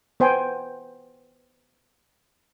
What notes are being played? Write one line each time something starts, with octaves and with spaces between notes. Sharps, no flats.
B3 C5 G5 G#5